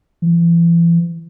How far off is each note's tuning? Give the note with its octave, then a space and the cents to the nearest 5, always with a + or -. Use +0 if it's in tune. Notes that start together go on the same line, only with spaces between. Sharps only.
E3 +40